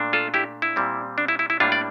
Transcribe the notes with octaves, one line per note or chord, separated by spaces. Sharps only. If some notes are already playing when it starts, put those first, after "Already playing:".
Already playing: A#2 A3 D4
F4 A4
E4 G4
E4
A#2 G3 C4
D4
E4
E4
E4
A2 G3 A#3 D4 F4
D5